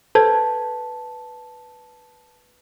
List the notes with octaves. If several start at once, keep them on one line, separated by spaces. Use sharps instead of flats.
A4 B4 C5 A5 G#6